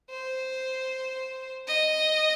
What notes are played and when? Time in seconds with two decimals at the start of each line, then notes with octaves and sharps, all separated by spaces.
0.10 C5
1.68 D#5